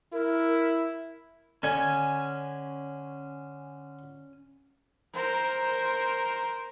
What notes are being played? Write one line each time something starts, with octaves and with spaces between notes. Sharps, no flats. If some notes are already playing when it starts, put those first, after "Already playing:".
E4 A#4
D3 C#4 G#5
A#4 C5